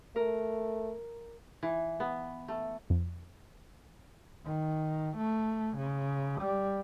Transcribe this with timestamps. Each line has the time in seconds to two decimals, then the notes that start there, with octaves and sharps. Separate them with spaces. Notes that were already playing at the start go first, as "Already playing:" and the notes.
0.16 A3 A#4
1.63 E3
2.00 B3
2.48 A3
2.90 F2
4.46 D#3
5.18 A3
5.78 C#3
6.42 G3